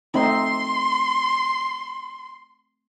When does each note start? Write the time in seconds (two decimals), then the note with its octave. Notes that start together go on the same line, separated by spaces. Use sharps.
0.14 A3 C4 D#4 C6